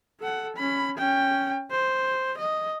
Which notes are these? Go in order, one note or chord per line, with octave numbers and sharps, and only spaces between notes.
A4 F#5
C#4 B5
C#4 G5
C5
D#5